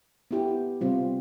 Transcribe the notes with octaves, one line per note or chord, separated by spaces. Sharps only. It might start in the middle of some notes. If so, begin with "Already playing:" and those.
B3 E4 G4
C3 G3 C4 F4